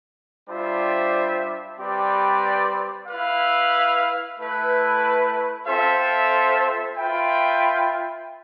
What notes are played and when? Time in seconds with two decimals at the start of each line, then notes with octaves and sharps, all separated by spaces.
0.48 G3 D4 F4 C5 E5
1.78 G3 C4 G4 B4 D5
3.07 E4 B4 F5
4.37 A3 E4 B4
5.66 C4 F4 A4 C5 E5
6.97 F4 B4 E5 G5